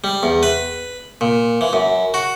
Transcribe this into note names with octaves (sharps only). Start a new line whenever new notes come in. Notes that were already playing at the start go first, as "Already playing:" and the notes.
G3
E2
B4
A#2
E3
F#2
F#4